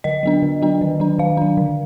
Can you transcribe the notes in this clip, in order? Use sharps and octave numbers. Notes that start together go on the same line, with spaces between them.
D3 D#5
F#3 B3 D4
D3
F#3 B3 D4
D#3
F#3 D4
D#3 F5
F#3 D4
D3